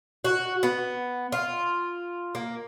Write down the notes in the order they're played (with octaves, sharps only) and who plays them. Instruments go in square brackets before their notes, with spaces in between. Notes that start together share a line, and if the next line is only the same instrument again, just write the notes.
[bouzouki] F#4
B3
F4
A#3